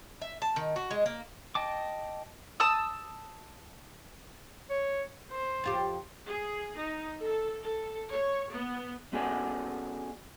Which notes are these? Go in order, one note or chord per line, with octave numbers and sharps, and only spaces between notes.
E5
A5
D#3
F#4
G#3
A#3
D#5 G5 A5 D6
A5 D#6 E6
C#5
C5
F2 F4 G4
G#4
D#4
A4
A4
C#5
B3
B3 C#4 F#4 G#4 A4 D5